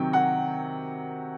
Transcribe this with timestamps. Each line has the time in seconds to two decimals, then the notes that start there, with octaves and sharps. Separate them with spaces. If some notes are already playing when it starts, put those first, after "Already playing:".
Already playing: C3 D#3 F#3 G5
0.13 F#5